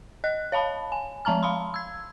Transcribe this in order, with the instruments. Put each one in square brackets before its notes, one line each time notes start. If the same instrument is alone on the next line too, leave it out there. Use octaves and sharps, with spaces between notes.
[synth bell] D#5 F#6
C#5 F5 A5 B5
G#5
F3 G#3 A5 A#5 F6
F5 B5 C6
E6 G#6